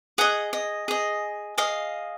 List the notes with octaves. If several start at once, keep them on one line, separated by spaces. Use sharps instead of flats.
G#4 D#5 F#5
D#5
G#4 D#5
G#4 D#5 F5